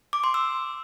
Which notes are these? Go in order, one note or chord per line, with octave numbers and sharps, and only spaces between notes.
D6
C6
E6